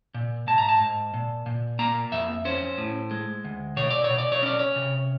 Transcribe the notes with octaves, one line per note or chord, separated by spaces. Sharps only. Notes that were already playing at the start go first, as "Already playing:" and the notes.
A#2
G#2 A5
A#5
A5
G#2
A#2
A#2
A#3 A#5
F2 E5
C#4 C5
A2
G#3
D2
B2 C#5
D5
C#5
B2
D5
C#5
C#4 D5
C#5
C3